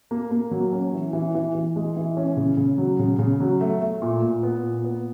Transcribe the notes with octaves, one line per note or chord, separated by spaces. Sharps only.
A#3
A#3
F#3
C#4
E3
E3
E3
E3
G#3
E3
C#4
C#3
C#3
F#3
C#3
C#3
F#3
A3
A3
A#2
A#2
B3
A#2
B3